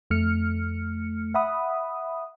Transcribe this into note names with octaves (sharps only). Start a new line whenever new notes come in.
F2 A3 F6 C#7
E5 F#5 B5 D#6